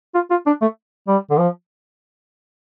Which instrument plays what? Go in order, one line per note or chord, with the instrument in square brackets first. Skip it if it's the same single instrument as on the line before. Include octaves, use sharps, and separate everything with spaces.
[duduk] F4
F4
D4
A3
G3
D3
F3